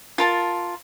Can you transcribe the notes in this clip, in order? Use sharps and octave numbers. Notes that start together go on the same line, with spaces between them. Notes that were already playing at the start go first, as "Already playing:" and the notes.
F4 A#4 A5